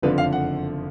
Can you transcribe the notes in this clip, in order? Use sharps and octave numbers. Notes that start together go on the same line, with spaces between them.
F#1 F2 D3 F3 B4
F5
F#5